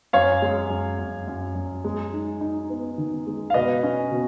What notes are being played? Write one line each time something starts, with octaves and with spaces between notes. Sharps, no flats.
F#2 C#5 F5
G#3
F#2
F#2
F#2
F#2
G#3
D#4
D#4
B3
D#3
G#3
F5
B2 B4 D#5
C#4
B2